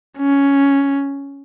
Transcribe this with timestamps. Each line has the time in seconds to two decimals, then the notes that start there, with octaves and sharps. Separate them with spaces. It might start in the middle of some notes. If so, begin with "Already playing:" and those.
0.19 C#4